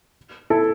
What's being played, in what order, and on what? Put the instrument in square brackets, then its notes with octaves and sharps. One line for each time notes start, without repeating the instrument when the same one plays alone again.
[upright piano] E4 A4